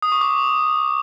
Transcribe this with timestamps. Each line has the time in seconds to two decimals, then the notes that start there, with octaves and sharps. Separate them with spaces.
0.02 D#6
0.12 C#6
0.21 D6